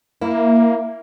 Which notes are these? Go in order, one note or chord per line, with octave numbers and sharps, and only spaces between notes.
A#3 E4